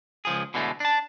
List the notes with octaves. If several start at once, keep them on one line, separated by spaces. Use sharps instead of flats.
C#2 F3 G#4
B2 D3 E3 G#3 A3
D4 A5